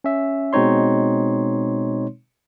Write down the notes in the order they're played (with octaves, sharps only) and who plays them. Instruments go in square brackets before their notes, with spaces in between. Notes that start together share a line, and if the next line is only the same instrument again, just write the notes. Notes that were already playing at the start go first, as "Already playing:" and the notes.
[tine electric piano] C#4 E5
B2 G#3 C4 D#4 C#5 C6